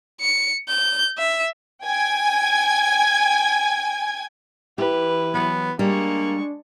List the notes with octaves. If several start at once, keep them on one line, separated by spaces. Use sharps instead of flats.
C#7
G6
E5
G5 G#5 G#6
E3 E4 G4 B4
F#3 B3
G3 G#3 A#3 D4 C#6